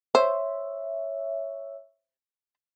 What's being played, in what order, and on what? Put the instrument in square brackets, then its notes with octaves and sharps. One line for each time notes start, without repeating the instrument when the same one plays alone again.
[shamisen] C5 [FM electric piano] C#5 E5